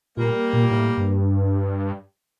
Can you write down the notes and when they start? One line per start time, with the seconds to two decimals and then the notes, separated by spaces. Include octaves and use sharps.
0.17 A#2 G3 A#3
0.53 A#2
0.71 A2
0.97 G2